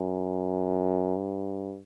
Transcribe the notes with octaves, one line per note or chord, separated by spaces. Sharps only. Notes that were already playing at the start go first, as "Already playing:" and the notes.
Already playing: F#2
G2